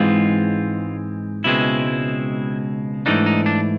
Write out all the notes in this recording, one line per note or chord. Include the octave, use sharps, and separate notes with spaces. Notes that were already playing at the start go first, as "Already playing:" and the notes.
Already playing: G#2 E3 G#3 C4 F4
C#2 B2 G#3 C4 E4
G#2 E3 A3 D4 D#4
D#4
D4